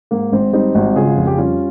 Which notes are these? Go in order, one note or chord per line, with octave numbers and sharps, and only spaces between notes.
G#2 A#3
G#1 C4
G3 C4 D#4
G#1
C#3 F4 G#4
F2
G4
G3 C#4 F4